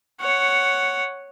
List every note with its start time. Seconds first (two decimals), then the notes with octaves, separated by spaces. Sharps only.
0.21 C#5 F#5